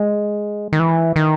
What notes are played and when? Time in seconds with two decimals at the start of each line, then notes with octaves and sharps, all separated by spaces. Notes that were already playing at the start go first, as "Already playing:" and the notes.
Already playing: G#3
0.73 D#3
0.79 E3
1.16 D#3